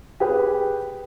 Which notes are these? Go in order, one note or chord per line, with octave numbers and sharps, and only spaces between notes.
G4 G#4 B4 G5